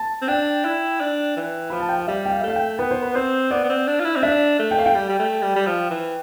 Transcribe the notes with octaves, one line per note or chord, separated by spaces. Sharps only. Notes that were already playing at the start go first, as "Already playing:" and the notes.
Already playing: A5
C4
D4 G5
E4
D4
E3
F3 B5
A5
G5
F5
G3 E5
G5
F5
E5
A3 F5
G5
B3 B4
C5
B4
C4 C5
B3 D5
B3
C4
D4
F4
E4
C4
D4 E5
A3
G5
F5
G5
G3
G3
A3
G3
G3
F3
E3